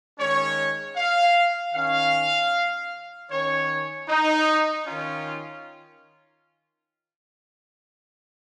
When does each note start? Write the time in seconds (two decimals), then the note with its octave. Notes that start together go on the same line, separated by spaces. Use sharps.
0.18 D#3 G#3 C#4 C#5
0.96 F5
1.74 D#3 C#4 F5
3.30 D#3 C#4 C#5
4.08 D#4
4.86 D#3 C#4 F4